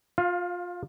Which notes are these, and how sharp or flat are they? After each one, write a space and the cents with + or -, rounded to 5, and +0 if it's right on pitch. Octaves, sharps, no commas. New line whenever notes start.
F4 +20 F5 -5